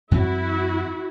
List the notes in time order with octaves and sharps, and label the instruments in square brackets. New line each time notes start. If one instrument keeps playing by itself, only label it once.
[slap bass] F#2 E3 C4 [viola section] E4 F#4